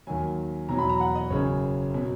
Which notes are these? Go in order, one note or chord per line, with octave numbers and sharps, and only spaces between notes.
D#2 D#3 F#3 G#5
E2 B2 F#3 A#5
B5
A#5
F#5
D#5
F#1 F#2 C#3 C#5
B2 F#3